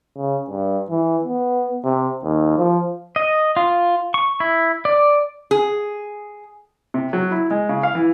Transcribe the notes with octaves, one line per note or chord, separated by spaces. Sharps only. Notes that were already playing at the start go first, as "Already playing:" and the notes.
C#3
G2
E3
B3
C3
D#2
F3
D#5
F4
C#6
E4
D5
G#4
C3
F#3
E4
G#3
C#3
F5
E3